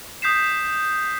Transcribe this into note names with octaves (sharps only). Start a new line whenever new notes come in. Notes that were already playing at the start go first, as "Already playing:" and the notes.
D#6 G6 B6 C7 E7